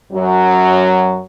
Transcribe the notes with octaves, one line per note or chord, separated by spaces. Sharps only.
F#2 F#3